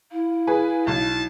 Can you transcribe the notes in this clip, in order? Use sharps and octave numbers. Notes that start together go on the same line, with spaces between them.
E4 F5
G#4 B4
B1 A5